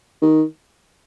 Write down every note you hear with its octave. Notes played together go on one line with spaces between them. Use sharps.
D#3